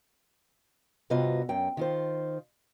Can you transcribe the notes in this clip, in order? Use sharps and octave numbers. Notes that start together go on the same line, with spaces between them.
G2 C3 B3 F4 F#4 D#5
F#2 G5
D#3 F4 C5